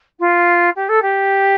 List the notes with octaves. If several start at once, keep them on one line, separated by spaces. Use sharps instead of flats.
F4
G4
A4
G4